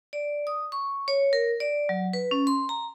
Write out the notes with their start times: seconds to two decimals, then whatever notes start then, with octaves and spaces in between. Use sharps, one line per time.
0.13 D5
0.47 D#6
0.72 C#6
1.08 C#5
1.33 A#4
1.60 D5
1.89 F#3
2.13 B4
2.31 C#4
2.47 C6
2.69 A#5